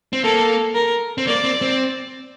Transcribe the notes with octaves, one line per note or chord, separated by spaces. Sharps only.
C4
A#3 A4
A#4
C4
A#3 D5
C4
C4